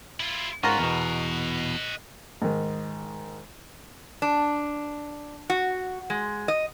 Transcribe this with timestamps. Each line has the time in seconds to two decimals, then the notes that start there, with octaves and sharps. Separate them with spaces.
0.20 E4 F4
0.63 G#2 C#4 F4 F#4 A#4 D#5 F#5
0.79 E2 B2
2.42 G#2 D#3
4.22 D4
5.50 F#4
6.10 G#3
6.48 D#5